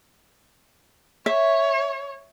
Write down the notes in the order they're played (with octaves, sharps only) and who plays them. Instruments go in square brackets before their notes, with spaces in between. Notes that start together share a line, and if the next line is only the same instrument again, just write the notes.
[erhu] C#5 [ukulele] E5